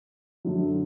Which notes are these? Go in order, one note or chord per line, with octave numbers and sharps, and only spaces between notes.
F#2 D3 F#3